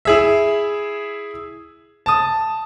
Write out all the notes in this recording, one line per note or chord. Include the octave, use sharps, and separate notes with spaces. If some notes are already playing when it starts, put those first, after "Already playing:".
E4 G#4 E5
A5 D#6